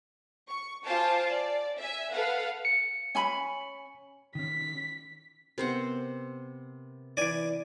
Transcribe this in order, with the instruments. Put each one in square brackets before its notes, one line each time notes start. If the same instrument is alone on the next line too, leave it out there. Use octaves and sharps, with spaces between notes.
[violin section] C#6
F4 C5 F5 G#5 A5 D6
D5
E5 G#5
A4 B4 F5 F#5
[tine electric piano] C#7
[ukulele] C#4 G#5 B5
[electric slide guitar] D#3 C#4 [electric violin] B6
[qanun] C3 C5 F#5 [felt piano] B3 A#4
[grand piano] E3 D7 [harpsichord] D5 G#5